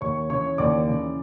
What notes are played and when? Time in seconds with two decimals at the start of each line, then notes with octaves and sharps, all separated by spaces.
0.01 D#2 C#5 C#6
0.30 C#3 E3 C#5 C#6
0.58 D#2 D5 D6
0.88 C#3 E3